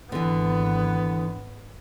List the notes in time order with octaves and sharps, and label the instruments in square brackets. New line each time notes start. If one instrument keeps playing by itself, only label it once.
[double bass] G#1 B3 [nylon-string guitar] D3 E3